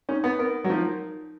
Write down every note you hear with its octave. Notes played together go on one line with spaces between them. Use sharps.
C#4 D#4
B3
B3 A#4
F#3
F3 D#4